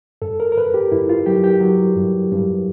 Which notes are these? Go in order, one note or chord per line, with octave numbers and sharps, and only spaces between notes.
G2 A4
A#4
A#4
G2 B4
G4
G2 E4
F4
F#3 G4
G4
F#3
G2
G2